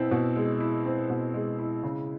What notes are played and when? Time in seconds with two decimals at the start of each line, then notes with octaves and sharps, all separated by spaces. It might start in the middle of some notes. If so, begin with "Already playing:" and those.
Already playing: B2 C4 E4
0.11 B2
0.36 G#3
0.60 E4
0.85 C4
1.10 B2
1.34 G#3
1.58 E4
1.83 C#3